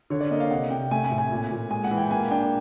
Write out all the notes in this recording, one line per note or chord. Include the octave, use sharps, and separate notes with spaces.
D3 C#5
D5
A#3 D#5
F5
C3 F#5
C3 G5
A3 G#5
G#5
A2
G#5
A#2
A#2
G#3 G#5
F#5
E3
G5
A#3 G#5
D4 G5